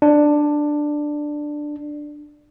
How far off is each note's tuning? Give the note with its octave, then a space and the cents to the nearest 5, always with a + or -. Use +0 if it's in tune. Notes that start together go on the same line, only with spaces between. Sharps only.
D4 +10